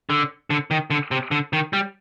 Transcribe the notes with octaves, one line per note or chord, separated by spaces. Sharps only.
D3
D3
D#3
D3
C3
D3
D#3
G3